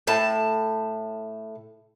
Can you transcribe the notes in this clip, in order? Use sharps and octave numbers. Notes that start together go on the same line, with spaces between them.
A2 A5